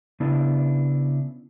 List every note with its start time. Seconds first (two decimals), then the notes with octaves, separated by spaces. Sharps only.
0.20 C#3 B3 D4 E4